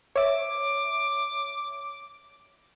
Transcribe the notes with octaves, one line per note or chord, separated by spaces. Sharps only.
C#5 E5 D6